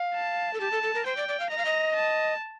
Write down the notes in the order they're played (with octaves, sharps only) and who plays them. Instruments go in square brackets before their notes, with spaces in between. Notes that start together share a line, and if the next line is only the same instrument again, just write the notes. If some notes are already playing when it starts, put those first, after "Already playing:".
Already playing: [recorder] F5
[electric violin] A5
[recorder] A4
[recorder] G4 [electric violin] A5
[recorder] A4
A4
A#4
[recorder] C5 [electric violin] G5
[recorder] D5
D5
F5
[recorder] D#5 [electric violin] A#5
[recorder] F5
D#5
[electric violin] A5